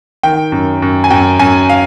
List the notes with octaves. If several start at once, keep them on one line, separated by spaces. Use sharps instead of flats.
D#3 G5
F#2
F#2
G#5
F#2 G5
F#2 G#5
F5